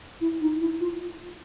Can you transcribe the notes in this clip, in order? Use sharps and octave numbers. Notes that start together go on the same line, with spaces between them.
E4
D#4
E4
F4